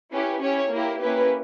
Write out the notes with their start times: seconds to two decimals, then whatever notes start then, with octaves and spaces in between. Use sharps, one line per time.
0.13 C#4 E4 G4 B4
0.42 C#4 E4 G4 C#5
0.71 A#3 E4 G4 A#4
1.00 A#3 C#4 E4 G4 B4